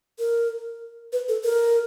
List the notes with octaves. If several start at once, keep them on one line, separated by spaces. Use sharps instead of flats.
A#4
B4
A4
A#4